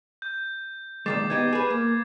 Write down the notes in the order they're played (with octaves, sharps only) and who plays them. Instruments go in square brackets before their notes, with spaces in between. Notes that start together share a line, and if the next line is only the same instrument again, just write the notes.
[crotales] G6
[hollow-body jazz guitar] A#2 D#3 G#3 [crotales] D6 A6 C7
[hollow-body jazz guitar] B3 D#4 G4 [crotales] G#6
[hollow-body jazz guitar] G#4 B4
A#3